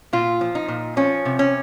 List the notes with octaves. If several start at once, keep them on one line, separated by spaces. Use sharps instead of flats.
A#2 F4
F3
D#4
A#2
F3 C#4
C3
C#4